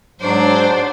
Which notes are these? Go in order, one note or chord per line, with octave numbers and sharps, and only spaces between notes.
G#2 F#3 D4 C5